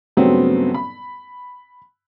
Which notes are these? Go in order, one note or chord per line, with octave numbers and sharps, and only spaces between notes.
G2 C#3 F#3 A3 B3 C4
B5